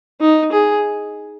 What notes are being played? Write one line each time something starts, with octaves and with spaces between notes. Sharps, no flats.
D#4
G#4